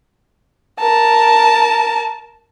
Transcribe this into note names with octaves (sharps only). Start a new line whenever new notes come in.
A#4 A5